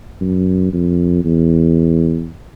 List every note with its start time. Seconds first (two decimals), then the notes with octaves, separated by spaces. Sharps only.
0.21 F#2
0.73 F2
1.24 E2